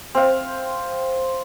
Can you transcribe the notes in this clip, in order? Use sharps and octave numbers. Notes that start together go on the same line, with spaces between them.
C4 F5